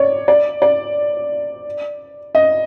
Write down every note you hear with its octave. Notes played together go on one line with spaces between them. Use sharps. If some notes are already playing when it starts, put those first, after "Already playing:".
Already playing: C#5 D5
D5
D5
D#5